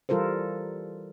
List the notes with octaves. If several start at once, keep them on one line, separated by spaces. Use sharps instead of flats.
E3 G3 F4 A4 A#4 C5